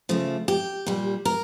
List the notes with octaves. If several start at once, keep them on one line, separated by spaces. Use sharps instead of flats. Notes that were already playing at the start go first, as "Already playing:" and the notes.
C#3 F3 A3
G4
A#2 G3
A#4